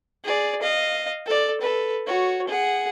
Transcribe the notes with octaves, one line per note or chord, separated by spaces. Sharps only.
G#4 D5
D#5 F5
A4 D5
A4 B4
F#4 C#5
G#4 F#5